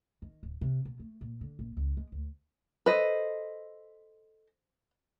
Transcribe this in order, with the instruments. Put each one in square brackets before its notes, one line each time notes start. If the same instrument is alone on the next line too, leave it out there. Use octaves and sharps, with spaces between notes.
[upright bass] D#3
D1
C3
B2
A3
A#2
D3
A#1
C#2
G#3
D2
[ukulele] A4 D#5 [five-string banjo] B4 C5